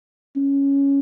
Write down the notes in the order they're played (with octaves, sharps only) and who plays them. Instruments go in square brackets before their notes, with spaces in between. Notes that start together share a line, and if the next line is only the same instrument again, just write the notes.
[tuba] C#4